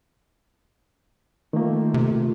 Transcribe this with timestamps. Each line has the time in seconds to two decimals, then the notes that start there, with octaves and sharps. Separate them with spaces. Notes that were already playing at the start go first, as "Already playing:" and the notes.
1.53 D#3 A3 A#3 F4
1.94 C3